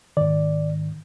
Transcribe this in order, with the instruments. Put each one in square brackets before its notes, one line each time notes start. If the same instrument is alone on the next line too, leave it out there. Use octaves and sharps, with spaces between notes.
[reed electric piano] G#2 D#3 D5